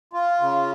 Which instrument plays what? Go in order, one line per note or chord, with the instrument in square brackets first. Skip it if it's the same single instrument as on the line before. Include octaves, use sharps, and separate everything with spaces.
[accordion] F4
C#3